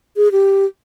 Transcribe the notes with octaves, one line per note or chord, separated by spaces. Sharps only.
G#4
G4